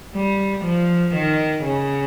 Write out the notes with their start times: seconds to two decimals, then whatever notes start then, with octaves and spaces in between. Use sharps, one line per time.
0.15 G3
0.65 F3
1.15 D#3
1.64 C#3